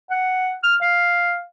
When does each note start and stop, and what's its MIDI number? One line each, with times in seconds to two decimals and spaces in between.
0.10 0.55 78
0.64 0.76 89
0.82 1.42 77